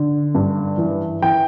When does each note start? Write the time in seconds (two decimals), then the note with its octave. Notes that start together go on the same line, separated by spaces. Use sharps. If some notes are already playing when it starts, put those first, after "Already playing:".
Already playing: D3
0.35 G2
0.78 E3
1.22 E3 G5